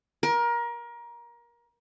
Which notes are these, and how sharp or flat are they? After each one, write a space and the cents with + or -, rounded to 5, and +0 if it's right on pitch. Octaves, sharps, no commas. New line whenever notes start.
A#4 +25